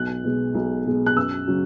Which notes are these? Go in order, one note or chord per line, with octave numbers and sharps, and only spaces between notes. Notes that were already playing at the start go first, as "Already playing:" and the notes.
Already playing: B1 F#6
B2 G#3
B1
B2 G#3
F#6
F#2 E6
C#3 F#3